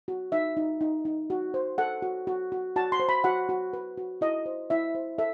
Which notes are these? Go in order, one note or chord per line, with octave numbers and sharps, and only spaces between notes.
F#4
D#4 E5
D#4
D#4
D#4
F#4
C5
A4 F#5
F#4
F#4
F#4
F#4 A5
C6
C5
B5
F#4 F#5
F#4
B4
F#4
E4 D#5
C5
E4 E5
C5
A4 E5